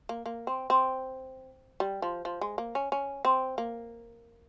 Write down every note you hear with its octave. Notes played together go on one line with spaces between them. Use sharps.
A#3
A#3
C4
C4
G3
F3
F3
G#3
A#3
C#4
C#4
C4
A#3